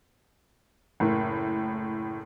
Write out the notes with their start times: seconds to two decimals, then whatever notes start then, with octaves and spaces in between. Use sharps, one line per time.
1.00 F#1 A2